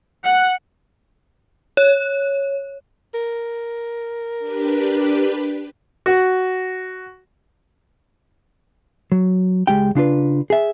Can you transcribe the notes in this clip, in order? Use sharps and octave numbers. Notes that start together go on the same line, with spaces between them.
F#5
C#5
A#4
D4 G4 B4
F#4
F#3
C#2 G#3 G4 G5
C#3 D4 F4 B4
G#4 E5